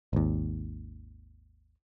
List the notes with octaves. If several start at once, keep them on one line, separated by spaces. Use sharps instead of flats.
G#1 D#2